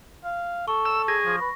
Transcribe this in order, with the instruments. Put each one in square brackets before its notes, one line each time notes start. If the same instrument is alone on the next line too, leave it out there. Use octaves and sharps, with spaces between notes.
[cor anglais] F5
[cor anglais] A4 [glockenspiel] C#6
[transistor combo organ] E6
[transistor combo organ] G#4 [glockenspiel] A#6
[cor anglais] F3
B4